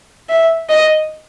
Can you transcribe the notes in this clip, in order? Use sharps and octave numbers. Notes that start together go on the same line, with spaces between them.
E5
D#5